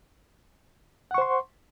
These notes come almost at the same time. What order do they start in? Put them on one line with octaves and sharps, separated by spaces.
F#5 C#6 C5 C6